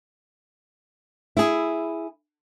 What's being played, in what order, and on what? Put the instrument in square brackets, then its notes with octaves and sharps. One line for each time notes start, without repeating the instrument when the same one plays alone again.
[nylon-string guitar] E4 G#4